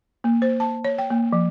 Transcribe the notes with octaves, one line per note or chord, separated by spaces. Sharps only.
A#3
C5
A5
C#5
G5
A#3
F3